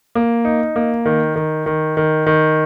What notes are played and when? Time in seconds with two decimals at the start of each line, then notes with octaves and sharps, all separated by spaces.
0.15 A#3
0.45 D#4
0.76 A#3
1.05 D#3
1.36 D#3
1.66 D#3
1.97 D#3
2.26 D#3